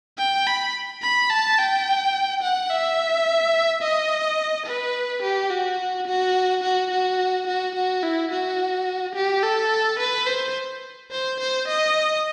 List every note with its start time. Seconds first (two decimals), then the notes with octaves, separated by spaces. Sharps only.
0.18 G5
0.47 B5
1.02 B5
1.30 A5
1.58 G5
2.42 F#5
2.70 E5
3.82 D#5
4.66 B4
5.22 G4
5.50 F#4
6.07 F#4
6.63 F#4
6.91 F#4
7.47 F#4
7.75 F#4
8.03 E4
8.31 F#4
9.15 G4
9.43 A4
9.99 B4
10.27 C5
11.11 C5
11.40 C5
11.68 D#5